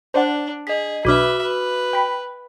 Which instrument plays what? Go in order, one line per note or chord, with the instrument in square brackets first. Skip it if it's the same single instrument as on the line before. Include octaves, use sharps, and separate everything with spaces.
[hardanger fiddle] D4 [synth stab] C5 D5 F#5
[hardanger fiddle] G#4 [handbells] D#5 B6
[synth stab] B1 B2 D4 [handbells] F#4 D6 F6 [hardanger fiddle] B4 E5
[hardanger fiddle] B4
[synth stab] G5 B5